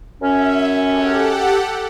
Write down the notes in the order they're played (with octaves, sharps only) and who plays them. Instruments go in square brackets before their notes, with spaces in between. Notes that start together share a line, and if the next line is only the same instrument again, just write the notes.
[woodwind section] F#2 C#4 [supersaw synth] E5
[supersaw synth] G4 A4 F#5